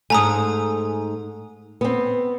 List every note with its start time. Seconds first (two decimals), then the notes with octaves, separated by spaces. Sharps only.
0.10 G#2 A3 G#5 A#5 D#6
1.81 B3 C4